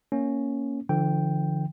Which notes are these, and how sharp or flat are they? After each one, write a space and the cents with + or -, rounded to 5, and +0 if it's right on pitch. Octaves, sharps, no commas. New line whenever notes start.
A#3 +0 C#4 +0
D3 +0 F3 -40 G5 +0